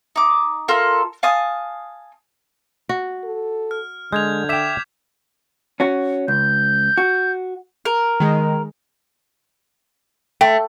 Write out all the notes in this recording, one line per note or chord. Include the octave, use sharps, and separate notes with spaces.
D#4 D6
F4 A4 A#4
F5 G#5 A5 D#6
F#4
A4
F6
D3 G#3 G6 G#6 F7
E5 G5 D6 B6 E7
C#4 F#4
C#2 G6
F#4
A#4
D#3 G#3
A3 G5